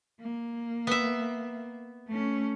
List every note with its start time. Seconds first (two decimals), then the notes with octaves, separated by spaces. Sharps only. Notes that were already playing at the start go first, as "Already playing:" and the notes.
0.20 A#3
0.87 B3 E5
2.08 A3 C#4